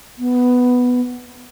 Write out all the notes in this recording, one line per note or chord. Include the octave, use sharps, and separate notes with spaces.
B3